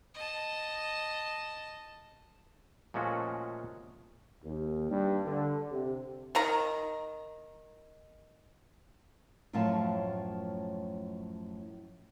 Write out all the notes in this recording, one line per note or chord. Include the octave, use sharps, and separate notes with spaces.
D#5 A5
A#2 F3 G#3 A3 C#4 F#4
D#2
G2
D3
C3
D#3 A#4 A#5
F#2 A2 F3 F#3 F5 A5